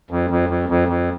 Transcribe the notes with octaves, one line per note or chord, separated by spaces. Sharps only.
F2
F2
F2
F2
F2